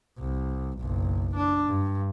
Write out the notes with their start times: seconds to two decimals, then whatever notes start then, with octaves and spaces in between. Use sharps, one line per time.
0.18 C2
0.79 F#1 B1
1.36 D4
1.68 G2